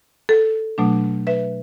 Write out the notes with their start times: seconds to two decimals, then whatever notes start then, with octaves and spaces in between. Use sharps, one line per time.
0.29 A4
0.78 B2 F#3 A3 D4
1.27 B4 E5